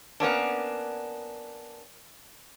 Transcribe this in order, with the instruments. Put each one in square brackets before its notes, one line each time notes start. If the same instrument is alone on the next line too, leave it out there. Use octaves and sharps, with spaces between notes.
[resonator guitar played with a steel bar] A#3 B3 C#4 D4